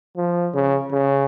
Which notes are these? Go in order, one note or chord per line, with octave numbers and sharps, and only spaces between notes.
F3
C#3
C#3